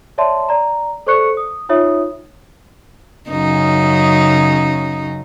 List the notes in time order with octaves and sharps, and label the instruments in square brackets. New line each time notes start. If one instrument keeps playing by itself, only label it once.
[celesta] C#5 D5 E5 A5 C6
D5 A#5
A4 C5 D5 C#6 F#6 C#7
D#6
D#4 F4 C#5 E5 D#6
[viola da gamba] F#2 C#3 D#4